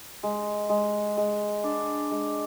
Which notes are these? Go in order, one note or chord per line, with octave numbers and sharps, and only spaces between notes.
G#3
G#3
G#3
D4
G#3